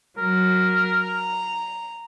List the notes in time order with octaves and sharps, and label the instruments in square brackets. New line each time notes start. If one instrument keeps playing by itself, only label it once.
[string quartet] F#3 [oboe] A#4
[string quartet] A#5